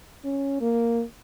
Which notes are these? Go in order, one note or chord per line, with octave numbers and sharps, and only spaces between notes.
C#4
A#3